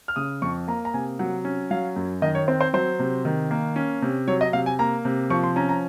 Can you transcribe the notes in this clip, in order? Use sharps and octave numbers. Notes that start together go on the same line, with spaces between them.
F6
C#3 D#6
F2 C#6
A#3 A#5
A#5
C3 G#5
F#3 F#5
C#4
F#3 F5
F#2
D#3 D#5
C#5
C4 C5
C5
F#3 C5
C3
D#3
A#3
C#4
C3
F#3 C#5
D#5
C3 F5
G#5
A#3 A#5
C3
F3 C#6
C6
C#4 A#5
A#5